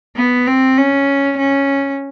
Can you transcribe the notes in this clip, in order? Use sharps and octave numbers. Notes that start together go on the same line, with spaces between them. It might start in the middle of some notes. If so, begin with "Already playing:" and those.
B3
C4
C#4
C#4